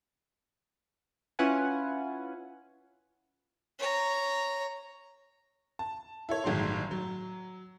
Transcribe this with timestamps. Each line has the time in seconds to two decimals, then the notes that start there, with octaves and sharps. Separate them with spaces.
1.39 C#4 E4 F4 B4 F#5 G#5
3.79 C#5 A#5
5.79 A5
6.29 E4 A4 C#5
6.44 G1 A2 D#3 F#3 G#4 C6
6.91 F#3